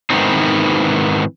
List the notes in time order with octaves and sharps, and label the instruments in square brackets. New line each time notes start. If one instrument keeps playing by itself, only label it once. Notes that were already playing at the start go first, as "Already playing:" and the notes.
[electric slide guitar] G#2 D#3 E3 B3 C4 D#4